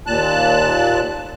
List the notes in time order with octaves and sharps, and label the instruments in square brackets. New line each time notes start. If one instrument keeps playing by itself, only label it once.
[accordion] D#2 A#2 A5 F#6